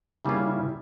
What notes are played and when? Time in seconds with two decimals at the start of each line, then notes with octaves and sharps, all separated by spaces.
0.25 C#3 G3 A#3 C#4 E4 F4
0.47 E4